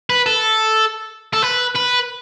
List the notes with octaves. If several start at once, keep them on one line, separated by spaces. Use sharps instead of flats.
B4
A4
A4
B4
B4